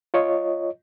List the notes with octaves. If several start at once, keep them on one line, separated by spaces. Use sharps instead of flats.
F4 C#5 D#5